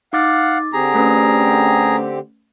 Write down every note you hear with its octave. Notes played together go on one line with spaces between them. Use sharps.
D#4 F5 F#5 D6 A6
D3 C4 G4 G#4 A#5
A3 C#4 B4